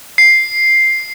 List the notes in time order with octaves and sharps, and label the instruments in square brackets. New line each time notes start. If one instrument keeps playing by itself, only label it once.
[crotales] C7